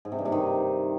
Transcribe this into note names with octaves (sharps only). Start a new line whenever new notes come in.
G#2
C3
G2
C3
D#3